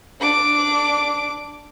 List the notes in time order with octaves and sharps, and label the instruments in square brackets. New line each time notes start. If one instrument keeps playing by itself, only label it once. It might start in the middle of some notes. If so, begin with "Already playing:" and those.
[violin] D4 D6